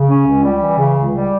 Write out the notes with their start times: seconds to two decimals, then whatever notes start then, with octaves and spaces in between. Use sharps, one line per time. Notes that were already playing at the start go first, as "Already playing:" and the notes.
Already playing: C#3
0.09 C#4
0.26 C#2
0.44 G3
0.61 E3
0.78 C#3
0.95 C#2
1.13 G3